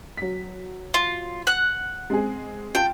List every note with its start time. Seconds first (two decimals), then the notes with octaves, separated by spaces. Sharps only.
0.17 F#3 B6
0.94 F4
1.47 F#5 F#6
2.10 G#3 C4 G#4
2.75 F4 G5 A5